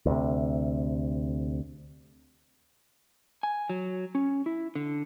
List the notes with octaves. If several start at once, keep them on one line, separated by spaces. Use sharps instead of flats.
D2 C3
G#5
F#3
C#4
E4
D3